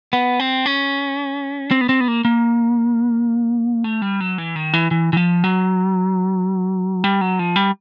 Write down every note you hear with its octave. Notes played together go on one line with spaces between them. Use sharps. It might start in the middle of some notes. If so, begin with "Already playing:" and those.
B3
C4
C#4
C4
B3
C4
B3
A#3
A#3
A3
G3
F#3
E3
D#3
E3
E3
E3
F3
F#3
G3
F#3
F3
G3